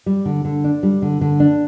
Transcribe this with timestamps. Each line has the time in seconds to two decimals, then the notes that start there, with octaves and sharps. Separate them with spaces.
0.06 G3
0.25 D3
0.45 D3
0.64 D4
0.83 G3
1.02 D3
1.21 D3
1.40 D4